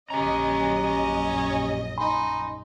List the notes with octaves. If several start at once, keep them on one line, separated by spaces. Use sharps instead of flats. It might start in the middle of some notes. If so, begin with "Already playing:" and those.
A#1 F#2 C#4 G4 D#5 A#5
C#4
D#4 G#5 B5 C6